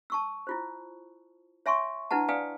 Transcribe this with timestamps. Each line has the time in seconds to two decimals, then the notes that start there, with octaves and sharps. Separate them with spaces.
0.10 A5 C#6 E6
0.47 E4 F4 C5
1.66 C#5 E5 G#5 C6 C#6
2.11 D4 E4 B4 F#5 A5
2.29 B4 D5 F5 G5 G#5 D#6